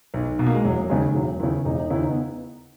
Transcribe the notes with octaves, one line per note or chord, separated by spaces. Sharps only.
B1
B2
A#3
G#3
E1 F#3
D#2 C#3 G#3
E1 F#3
D#2 C#3 E4
E1 D#4
D#4
D#2 C#3 E4
D#4
B3